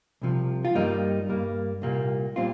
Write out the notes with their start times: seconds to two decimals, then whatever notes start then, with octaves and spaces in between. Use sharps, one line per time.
0.22 C2 C3 F3
0.65 F4
0.75 G2 G3 A#3 D#4
1.29 G2 G3 A#3
1.82 C2 A#2 G3 A#3
2.36 A#2 G3 C4 F4